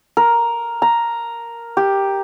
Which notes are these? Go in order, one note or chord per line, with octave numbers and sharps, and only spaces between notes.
A#4
A#5
G4